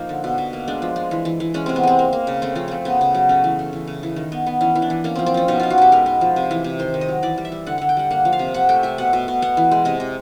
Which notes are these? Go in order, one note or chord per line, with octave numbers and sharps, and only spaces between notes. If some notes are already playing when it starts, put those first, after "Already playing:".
Already playing: F3 A#3 D#4
D3
B2
B2
A#3
G#3 D4
F3
G#3
E3
E3
E3
G#3 C#4
C3 C4
B3
G#3 C4
A#3
A#3
C#3
A3 C4
F3 C#4
A3 C4
C#3 B3
C#3
F#3
A3 C#4
E3
A3
E3
C#3
E3
D#3
B3
B3
E3 C#4
E3
D4
E3
A#3 C#4
F3 C4
C4
F3 C#4
B2 D#4
B2 F4
F#4
B2 G4
G#3 A#4
B3
F3
C3
E3
C3
D#3 C5
D#3
D#5
F#3
E3 D5
G3
E5
G3
D3 F#5
D3 F#5
G5
G3 F#5
A#3 F#5
F3
F5
C3
C3 F#5
A3 G5
A3 E5
B2 F#5
B2
B2
B3 F#5
E3
G#3
C3 D#5
C3